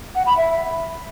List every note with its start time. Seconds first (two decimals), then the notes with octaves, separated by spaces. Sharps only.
0.15 F#5
0.26 B5
0.37 E5